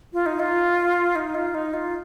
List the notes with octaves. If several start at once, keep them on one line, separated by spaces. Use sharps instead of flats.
F4
D#4
F4
D#4
F4
D#4
F4